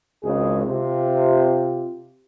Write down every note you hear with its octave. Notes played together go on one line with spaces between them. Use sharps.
G#1 C#2 G#3 G#4
C3 F4